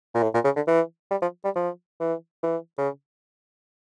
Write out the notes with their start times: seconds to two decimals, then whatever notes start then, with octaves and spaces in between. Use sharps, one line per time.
0.15 A#2
0.23 A2
0.34 A#2
0.44 C#3
0.56 D3
0.67 E3
1.11 G3
1.22 F3
1.44 G3
1.55 F3
2.00 E3
2.43 E3
2.78 C#3